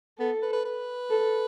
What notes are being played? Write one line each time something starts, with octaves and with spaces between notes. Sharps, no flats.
B3 A4
B4
B4
B4
A4